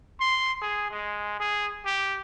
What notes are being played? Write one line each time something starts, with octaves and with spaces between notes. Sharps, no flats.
C6
G#4
G#3
G#4
G4